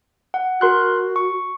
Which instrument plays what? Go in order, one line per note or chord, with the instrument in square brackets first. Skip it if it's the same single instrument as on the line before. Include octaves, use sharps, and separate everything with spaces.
[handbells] F#5
[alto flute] F#4 [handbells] A#4 C6 F#6
[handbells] C#6